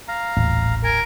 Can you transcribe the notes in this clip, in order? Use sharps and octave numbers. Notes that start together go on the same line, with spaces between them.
F5 A#5
D#1 A1
A#4 G#5